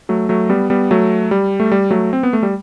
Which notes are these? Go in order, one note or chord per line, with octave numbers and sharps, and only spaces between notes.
F#3 A3
F#3 A3
G3 B3
G3 B3
F#3 A3
G3
A3
G3
F#3 A3
C4
B3
A3
G3